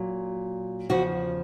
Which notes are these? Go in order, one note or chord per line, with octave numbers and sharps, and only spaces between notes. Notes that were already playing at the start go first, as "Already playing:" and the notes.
Already playing: A#2 F#3
E2 C#3 F3 F#4